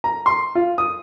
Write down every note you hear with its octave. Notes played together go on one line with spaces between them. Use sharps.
A#5
C6
F4
D#6